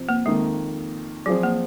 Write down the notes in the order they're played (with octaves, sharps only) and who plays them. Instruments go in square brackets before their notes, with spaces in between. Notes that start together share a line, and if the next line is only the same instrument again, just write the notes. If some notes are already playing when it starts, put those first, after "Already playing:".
Already playing: [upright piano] C3 F3 C4
[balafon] A#3
[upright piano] F2 D#3 A#3 [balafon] G#3
[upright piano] F3 C4 F4 G#4 [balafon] F#3
[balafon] A#3